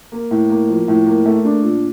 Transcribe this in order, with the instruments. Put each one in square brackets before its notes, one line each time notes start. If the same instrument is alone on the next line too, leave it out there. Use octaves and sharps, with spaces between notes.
[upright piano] A#3
A2
A#3
F3
A2
A#3
A3
D4
A#2